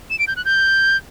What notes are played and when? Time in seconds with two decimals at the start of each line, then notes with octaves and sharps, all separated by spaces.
0.10 E7
0.19 D7
0.28 G6
0.36 F#6
0.45 G6